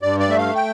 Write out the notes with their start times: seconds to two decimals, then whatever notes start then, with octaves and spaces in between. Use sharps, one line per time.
0.02 G2 D5
0.20 D5
0.29 A3 E5
0.38 F5
0.55 G5